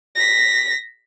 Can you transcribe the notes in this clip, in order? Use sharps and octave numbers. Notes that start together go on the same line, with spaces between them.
A#6 B6